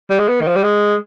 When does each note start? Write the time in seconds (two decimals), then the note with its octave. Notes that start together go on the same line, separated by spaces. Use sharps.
0.10 G3
0.19 G#3
0.28 B3
0.41 D#3
0.47 F3
0.56 G3
0.63 G#3